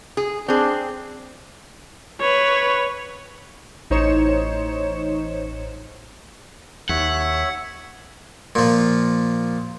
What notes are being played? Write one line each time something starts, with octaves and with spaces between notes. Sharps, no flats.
G#4
C4 D4 G#4
B4 C#5
A1 D#4 C5 C#5 C#7 E7
D#2 C#5 E5 F#5
A#2 F3